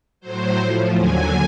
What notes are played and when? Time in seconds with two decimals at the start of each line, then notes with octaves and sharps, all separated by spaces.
0.21 A2 F#3 C5
0.58 A2 F3
0.96 D#2 D3 F#3 G#5